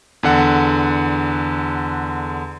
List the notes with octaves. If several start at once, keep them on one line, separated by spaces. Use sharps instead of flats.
E2 D3 F#5